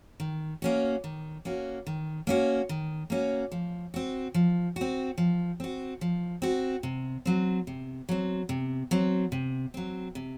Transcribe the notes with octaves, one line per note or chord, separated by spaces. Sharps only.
D#3
A#3 C#4 F#4
D#3
A#3 C#4 F#4
D#3
A#3 C#4 F#4
D#3
A#3 C#4 F#4
F3
C4 F#4
F3
C4 F#4
F3
C4 F#4
F3
C4 F#4
C3
F#3 C4
C3
F#3 C4
C3
F#3 C4
C3
F#3 C4
C3